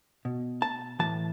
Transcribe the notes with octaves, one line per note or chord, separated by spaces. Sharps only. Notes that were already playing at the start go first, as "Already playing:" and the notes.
B2
A5
A2 E3 A5